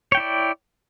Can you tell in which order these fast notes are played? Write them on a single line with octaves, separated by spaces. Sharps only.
C#5 G5 E4 D5